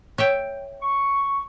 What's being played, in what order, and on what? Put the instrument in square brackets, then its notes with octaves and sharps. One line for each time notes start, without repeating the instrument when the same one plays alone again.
[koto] C#5 E5 G5
[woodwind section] C#6